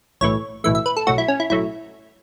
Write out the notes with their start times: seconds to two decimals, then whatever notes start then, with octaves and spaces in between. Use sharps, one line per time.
0.21 B1 A2 E3 A3 C#5
0.64 B1 A2 E3 A3 E5
0.75 E5
0.86 B4
0.97 A4
1.07 B1 A2 F#3 A3 F#4
1.18 E4
1.28 C#4
1.40 E4
1.50 B1 A2 F#3 A3 E4